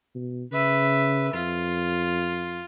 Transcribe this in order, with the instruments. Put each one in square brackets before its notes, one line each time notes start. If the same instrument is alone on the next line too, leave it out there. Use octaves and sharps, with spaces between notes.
[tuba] B2
[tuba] C#3 [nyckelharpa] B4 E5
[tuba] F2 [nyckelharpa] F4